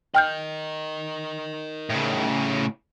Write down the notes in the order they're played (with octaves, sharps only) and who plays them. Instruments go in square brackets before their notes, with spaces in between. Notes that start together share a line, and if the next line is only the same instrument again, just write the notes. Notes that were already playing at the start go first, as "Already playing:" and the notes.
[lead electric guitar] A#4 D#5 [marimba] G5 F6 G6
[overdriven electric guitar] A2 C#3